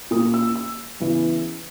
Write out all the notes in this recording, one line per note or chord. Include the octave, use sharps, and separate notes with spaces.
A#2 A#3 C#4 D#6
E6
E6
E2 C#3 E3